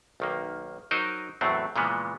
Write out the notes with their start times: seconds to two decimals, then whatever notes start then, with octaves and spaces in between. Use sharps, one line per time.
0.20 B1 D#3 A#3
0.91 F#3 D#4 A#4 C5 D#5
1.41 E2 A2 F#3 A3 C4
1.76 A#2 C#3 E3 F3 G#3 B3